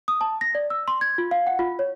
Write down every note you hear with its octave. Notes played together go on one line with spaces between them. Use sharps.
D#6
A5
A#6
D5
E6
C6
G#6
F4
F5
F#5
F4
C#5